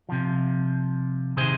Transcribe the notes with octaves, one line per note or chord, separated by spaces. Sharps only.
C3 F3
C3 D#3 G#4 C5